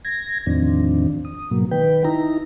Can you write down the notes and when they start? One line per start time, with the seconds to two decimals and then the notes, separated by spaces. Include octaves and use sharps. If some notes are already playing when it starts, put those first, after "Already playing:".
0.05 G#6 A#6
0.46 E2 A2 D#3 F3 C4 D4
1.25 D#6
1.51 G#2 B2 F#3 A#3
1.71 D#3 B4 G5
2.05 D#4 E4 A#5